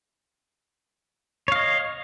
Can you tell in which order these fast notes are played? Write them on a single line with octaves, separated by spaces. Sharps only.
C#5 F5 D#5